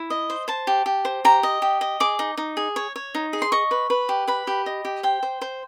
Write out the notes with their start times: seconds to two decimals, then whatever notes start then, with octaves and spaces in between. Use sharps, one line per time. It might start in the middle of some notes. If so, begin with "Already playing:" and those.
Already playing: E4
0.10 D#5
0.30 C5
0.48 C5 A5
0.67 G4
0.86 G4
1.05 C5
1.25 G4 A#5
1.43 D#5
1.62 G4
1.81 D#5
2.00 G#4 D6
2.19 D#4
2.37 D#4
2.57 G#4
2.76 C#5
2.96 C#5
3.15 D#4
3.33 G#4
3.42 C6
3.52 D#5 C#6
3.71 B4
3.90 B4
4.09 G4
4.28 B4 B5
4.47 G4
4.66 D#5
4.85 G4
5.03 C5 G5
5.23 C5
5.41 C5